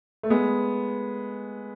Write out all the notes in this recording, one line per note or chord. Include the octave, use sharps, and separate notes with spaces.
A3
G#3 B3